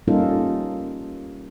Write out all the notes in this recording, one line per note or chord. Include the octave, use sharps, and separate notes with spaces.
G3 A#3 C#4 D#4 F4 A4